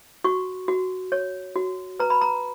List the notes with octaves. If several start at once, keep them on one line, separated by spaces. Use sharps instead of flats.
F#4 C#6
F#4
C#5
F#4
B4 A#5
B5
A#5